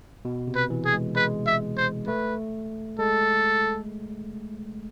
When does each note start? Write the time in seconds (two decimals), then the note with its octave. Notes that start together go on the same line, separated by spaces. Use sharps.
0.25 B2
0.48 C3
0.55 B4
0.70 E3
0.85 G#4
0.93 G#3
1.16 G#3 B4
1.47 E5
1.77 C5
2.07 A3 B4
2.99 G#3 A4